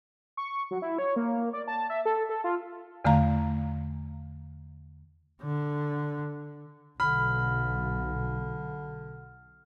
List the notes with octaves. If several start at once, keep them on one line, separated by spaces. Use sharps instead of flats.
C#6
F#3
E4
C#5
A#3
D5
A5
E5
A4
A4
F4
E2 D3 A3 F5 A#5
D3
B1 D3 B5 F6